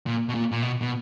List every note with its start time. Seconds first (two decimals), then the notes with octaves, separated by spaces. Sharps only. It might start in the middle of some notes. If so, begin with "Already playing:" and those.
0.07 A#2
0.29 B2
0.35 A#2
0.52 A#2
0.63 B2
0.82 B2